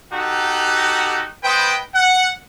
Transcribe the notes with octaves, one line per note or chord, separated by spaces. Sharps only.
D#4 F#4 G4 A4 F#5 A#5
B3 B4 C5 D#5 G5
F#5